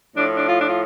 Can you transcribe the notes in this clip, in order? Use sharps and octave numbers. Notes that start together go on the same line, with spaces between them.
A2 F3 D4
D4
F4
D4
F4